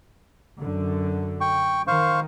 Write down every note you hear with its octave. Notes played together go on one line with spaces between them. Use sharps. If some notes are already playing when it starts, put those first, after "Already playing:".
F#2 D3
G5 C#6
D#3 C5 F5 C#6